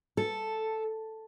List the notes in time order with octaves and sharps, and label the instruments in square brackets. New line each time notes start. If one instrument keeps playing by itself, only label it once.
[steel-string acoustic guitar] A4